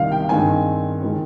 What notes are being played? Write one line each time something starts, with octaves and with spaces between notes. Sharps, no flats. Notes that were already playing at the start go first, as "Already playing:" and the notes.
Already playing: C2 C3 D#3 G3 F5
G5
G2 D#3 G#3 C4 G#5
D#3 G#3 C4